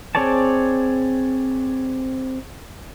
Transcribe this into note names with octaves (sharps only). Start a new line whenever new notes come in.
C4 G#4 C#5 D5 A5